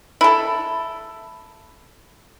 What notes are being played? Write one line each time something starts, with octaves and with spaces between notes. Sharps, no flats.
E4 A4